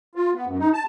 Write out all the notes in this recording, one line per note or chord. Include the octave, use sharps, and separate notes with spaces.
F4
B3
F#2
D#4
A5